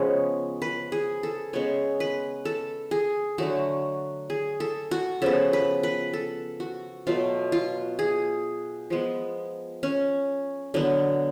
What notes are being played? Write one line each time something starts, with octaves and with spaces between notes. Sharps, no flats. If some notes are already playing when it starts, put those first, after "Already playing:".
Already playing: C#3 F3 G#3 B3 C#5
B4
G#4
A4
C#3 G#3 B3 C#5
B4
A4
G#4
D3 F#3 A3 F#4
G#4
A4
F#4
C#3 F3 B3 A4
B4
B4
A4
F#4
B2 F#3 A3 F4
F4
G#4
F3 G#3 B3
C#4
D3 F#3 B3